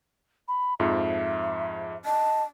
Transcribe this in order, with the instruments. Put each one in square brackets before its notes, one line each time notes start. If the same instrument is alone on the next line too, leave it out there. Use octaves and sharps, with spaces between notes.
[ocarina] B5
[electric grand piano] F2 G#2 F3 [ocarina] E5
[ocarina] D#5 [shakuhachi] A5